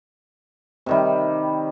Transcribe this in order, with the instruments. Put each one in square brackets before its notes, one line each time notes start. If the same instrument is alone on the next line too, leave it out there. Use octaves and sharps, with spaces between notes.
[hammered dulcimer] C3 D#3 G3